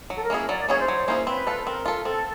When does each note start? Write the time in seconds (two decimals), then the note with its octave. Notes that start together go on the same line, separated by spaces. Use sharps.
0.10 F#3
0.16 A4
0.23 A#4
0.30 A#3 C#4 E4 G#4
0.49 F#3 D5
0.59 D5
0.69 A#3 C#4 E4 G#4 C#5
0.78 C5
0.88 F#3
1.08 A#3 C#4 E4 G#4
1.27 C4 B4
1.47 F4 A4
1.66 C4 A#4
1.86 F4 A4
2.05 C4 A4